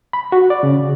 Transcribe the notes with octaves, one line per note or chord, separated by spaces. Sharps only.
B5
F#4
D5
C#3